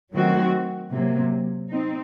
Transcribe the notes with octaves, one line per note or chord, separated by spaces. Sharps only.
D#3 F#3 A3 C4 F#4
C3 F#3 A#3
C4 D#4